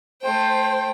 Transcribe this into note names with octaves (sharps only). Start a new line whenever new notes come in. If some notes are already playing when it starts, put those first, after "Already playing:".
A3 C5 G5